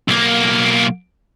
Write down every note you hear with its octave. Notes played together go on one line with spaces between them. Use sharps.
B1 A#3